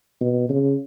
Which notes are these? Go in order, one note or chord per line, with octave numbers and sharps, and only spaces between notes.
B2
C#3